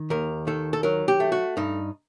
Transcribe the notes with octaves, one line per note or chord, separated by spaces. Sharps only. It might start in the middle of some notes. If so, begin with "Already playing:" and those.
Already playing: D#3
D#2 A#4
D#3 A4
A4
F#3 A#4
G4
A3
F#4
G2 D#4